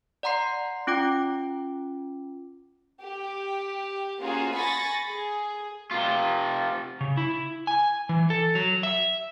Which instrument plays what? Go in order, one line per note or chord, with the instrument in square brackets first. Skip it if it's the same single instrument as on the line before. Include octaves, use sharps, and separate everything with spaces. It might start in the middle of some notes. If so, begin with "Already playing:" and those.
[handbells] D5 F#5 A#5 C6 C7
C#4 F4 G5 D6
[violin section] G4
A#3 C#4 F4 F#4 G#4
G#5 B5 C#6 A6 A#6
G#4
[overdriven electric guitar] C3 F4
[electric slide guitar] C#3
E4
G#5
E3
A4
F#3
E5